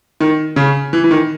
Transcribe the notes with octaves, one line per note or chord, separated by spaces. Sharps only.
D#3
C#3
E3
E3
D#3